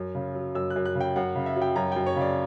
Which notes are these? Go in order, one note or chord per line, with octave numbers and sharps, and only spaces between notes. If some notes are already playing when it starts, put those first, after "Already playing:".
Already playing: F#2
C#3
F#3
F#2 E6
F#6
F#2
F#6
C#3
G5
F#2 F#5
C#3
E5
F#3
G5
F#2 A#5
F#2 G5
C#5
C#3 D5